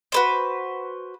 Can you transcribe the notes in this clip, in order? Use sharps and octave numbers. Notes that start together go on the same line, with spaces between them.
F#4 B4 C5